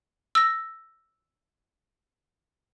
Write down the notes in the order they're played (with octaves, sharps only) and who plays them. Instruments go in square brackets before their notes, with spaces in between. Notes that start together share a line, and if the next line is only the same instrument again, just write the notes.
[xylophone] E6 A#6